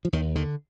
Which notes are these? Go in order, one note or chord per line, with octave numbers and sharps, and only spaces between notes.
F3
D#2 D#3
D3 D#3